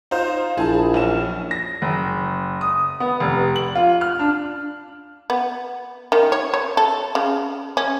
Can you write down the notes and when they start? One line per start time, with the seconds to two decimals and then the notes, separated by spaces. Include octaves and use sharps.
0.11 D#4 F4 C5
0.57 A#1 E4 G#4 A5
0.94 B1 C#4 E7
1.51 A#6
1.82 F#1
2.61 D#6
3.00 B3
3.20 F1
3.56 F#7
3.75 F4
4.01 F6
4.19 D4
5.30 B3
6.12 D#3
6.32 C#5
6.54 C#5
6.77 A4
7.15 C#3
7.77 C#4